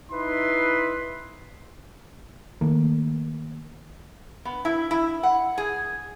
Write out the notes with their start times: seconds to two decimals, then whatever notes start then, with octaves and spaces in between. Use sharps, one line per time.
0.12 D#4 E4 B4 C6
2.61 D#3 A3 A#3
4.45 B3
4.65 E4
4.91 E4
5.23 F#5
5.58 G#4